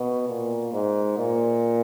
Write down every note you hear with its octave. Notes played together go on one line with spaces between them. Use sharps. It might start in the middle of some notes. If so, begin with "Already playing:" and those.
Already playing: B2
A#2
G#2
A#2